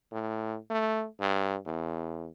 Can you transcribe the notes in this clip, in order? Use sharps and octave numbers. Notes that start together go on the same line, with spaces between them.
A2
A3
G2
E2